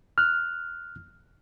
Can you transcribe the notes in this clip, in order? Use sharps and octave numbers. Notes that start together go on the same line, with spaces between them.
F6 F#6